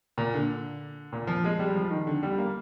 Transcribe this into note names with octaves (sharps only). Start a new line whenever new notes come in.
A#2
D3
A#2
F3
G#3
G3
F3
D#3
D3
G3
A#3